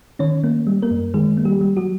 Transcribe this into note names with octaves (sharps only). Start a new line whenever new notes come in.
D#3 C#4 C#5
A#3
G3
A#3 A#4
F#2
D#3 G#3 G#4
A#3
G3 G4
G3
F#3 F#4